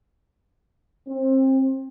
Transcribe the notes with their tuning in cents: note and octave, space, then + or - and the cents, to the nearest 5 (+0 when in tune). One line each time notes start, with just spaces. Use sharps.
C4 +25